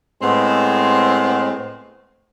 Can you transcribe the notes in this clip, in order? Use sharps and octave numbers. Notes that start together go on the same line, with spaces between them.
A2 G#3 B3 C4